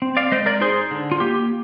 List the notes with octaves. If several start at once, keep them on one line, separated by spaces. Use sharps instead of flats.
C4
D5 F5
G#3 C5 D#5
A#4 D5
D#4 G#4 C5
D3
F4
A#3 G4